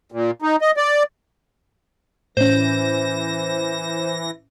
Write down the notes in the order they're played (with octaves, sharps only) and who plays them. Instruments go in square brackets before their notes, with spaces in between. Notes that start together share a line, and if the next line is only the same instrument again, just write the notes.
[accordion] A#2
D#4
D#5
D5
[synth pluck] A2 C#4 [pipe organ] E3 A#6 [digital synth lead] C5